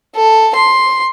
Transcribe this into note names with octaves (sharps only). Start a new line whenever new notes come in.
A4
C6